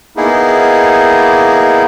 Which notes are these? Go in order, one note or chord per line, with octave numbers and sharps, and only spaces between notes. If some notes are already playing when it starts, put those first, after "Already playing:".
A#3 B3 D#4 E4 G#4